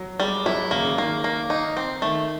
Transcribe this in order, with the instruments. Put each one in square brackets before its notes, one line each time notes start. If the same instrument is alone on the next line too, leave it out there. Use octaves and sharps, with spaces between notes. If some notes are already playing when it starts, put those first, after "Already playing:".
Already playing: [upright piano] F#3
[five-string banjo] G3 [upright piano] G#3
[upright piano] F#3 [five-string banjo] E4
[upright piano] C#3 [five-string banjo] A#3
[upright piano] C#3
[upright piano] D#3 [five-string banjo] A#3
[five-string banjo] A#3
D#4
C4
[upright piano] D#3 [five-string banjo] A3